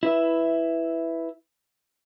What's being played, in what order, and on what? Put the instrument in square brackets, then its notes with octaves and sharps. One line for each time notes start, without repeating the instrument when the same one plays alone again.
[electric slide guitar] E4 B4 E5